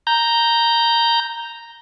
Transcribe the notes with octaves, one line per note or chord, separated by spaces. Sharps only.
A#5 G6